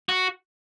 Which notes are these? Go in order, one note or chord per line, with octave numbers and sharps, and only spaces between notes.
F#4